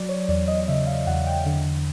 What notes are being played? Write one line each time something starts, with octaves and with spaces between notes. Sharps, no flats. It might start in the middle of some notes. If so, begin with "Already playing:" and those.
Already playing: F#3 D5
C#5
E2 D5
D#5
C#3 E5
F5
E2 F#5
G5
D3